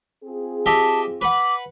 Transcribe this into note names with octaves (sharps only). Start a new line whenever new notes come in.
C4 F4 G#4
G4 D#5 E5 A5
B4 F#5 D6